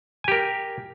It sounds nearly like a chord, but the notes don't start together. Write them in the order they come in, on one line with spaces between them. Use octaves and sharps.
G#5 G4 A#4